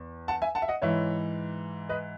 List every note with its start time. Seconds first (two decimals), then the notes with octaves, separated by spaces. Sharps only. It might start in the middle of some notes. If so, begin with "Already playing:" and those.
Already playing: E2
0.28 F#5 A5
0.42 E5 G#5
0.55 F#5 A5
0.62 E5
0.68 D#5 F#5
0.82 G#2 E3 C#5 E5
1.89 B4 D#5